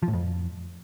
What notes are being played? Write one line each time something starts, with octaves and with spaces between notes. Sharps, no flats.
F3
A2
F2